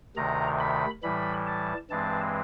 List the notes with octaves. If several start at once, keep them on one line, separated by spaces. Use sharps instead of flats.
D2 C3 D#3 A#5
B5
A2 E3 G3 B5
A5
G2 E3 G#3 C4 A5